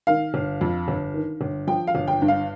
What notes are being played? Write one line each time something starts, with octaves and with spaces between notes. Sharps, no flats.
D#3 F5
G1
F2
G1
D#3
G1
F3 G5
F5
G1
G5
G2
F5